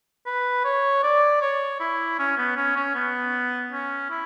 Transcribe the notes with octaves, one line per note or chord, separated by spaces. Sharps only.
B4
C#5
D5
C#5
E4
C#4
B3
C#4
C#4
B3
C#4
E4